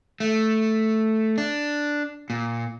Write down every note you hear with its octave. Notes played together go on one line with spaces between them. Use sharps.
A3
D4
A#2